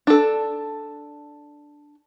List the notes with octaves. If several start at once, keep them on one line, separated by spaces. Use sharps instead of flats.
D4 A4